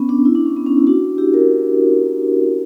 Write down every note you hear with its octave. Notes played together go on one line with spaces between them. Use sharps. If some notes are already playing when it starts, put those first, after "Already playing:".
Already playing: B3 C#4
D4
E4
D4
C#4
B3
C#4
E4
D4 F#4
E4 G4
F#4 A#4